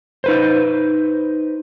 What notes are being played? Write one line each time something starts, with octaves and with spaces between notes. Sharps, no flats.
D#4 B4 C5